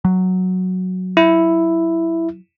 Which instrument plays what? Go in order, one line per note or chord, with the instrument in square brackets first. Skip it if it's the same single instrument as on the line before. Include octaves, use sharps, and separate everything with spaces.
[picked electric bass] F#3
[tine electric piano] E4